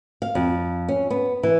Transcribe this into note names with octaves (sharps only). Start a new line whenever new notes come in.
F5
F2
C#4
B3
E3